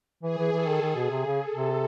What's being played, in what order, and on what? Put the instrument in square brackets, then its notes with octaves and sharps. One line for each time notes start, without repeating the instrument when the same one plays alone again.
[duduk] E3 [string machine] G#4
[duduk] E3
[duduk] E3 [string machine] A4
[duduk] D#3
[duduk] D#3 [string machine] G#4
[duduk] B2
[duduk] C3 [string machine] G#4
[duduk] C#3
[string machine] A4
[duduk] C3